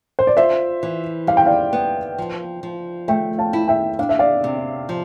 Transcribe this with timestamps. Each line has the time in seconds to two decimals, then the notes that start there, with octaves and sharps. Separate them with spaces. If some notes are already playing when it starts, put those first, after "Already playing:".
0.19 C5
0.27 D5
0.37 F4 C5 E5
0.83 E3
1.27 G3 F5
1.37 G5
1.46 D5 F5
1.73 B3
2.18 F3
2.63 F3
3.08 A3 E5 G5
3.38 F5 A5
3.53 E4
3.68 E5 G5
3.99 D4 F5
4.09 E5
4.19 D5 F5
4.44 C3
4.89 F3